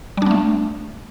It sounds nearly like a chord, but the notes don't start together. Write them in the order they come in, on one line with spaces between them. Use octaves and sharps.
G3 D4 B3 A3